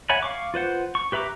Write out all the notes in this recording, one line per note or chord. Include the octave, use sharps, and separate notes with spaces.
C#5 E5 F#5 G#5 B5
F5 C#6 D6
F4 B4 C5 F#5
C#6
G4 B4 E5 A#5 D6